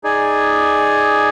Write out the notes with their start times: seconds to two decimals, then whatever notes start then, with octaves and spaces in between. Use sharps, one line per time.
0.04 D#4 G#4 D5 G#5